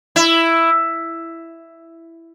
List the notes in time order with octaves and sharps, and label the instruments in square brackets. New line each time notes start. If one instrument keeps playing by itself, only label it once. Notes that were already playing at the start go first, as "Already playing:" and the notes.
[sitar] E4